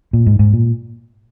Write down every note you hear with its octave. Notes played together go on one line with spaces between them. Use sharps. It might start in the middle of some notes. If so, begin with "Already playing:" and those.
A#2
G#2
G#2
A#2